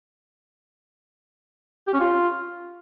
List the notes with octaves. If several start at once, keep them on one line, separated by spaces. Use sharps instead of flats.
G4
C#4
F4